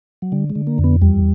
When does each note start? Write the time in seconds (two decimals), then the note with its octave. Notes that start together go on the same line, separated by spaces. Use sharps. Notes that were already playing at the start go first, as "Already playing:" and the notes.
0.22 F#3
0.32 D3 G3
0.50 G#3
0.55 D3
0.67 A#3
0.78 F2
0.84 B3
1.02 E2 G3